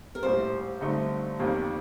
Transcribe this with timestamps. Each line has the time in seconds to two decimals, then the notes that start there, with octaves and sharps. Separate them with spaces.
0.15 A#4
0.23 A#1 A2 G3 C5
0.81 G2 D3 A3 C4 D#4
1.39 G1 F2 D#3 G3 A#3